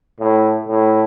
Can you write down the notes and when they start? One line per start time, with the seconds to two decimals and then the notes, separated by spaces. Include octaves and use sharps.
0.20 A2
0.68 A2